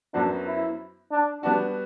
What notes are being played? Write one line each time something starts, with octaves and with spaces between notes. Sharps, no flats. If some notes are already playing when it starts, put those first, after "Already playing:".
F#2 F#3 B3 D4 F#4 C5
E4
D4
G3 B3 D4 F#4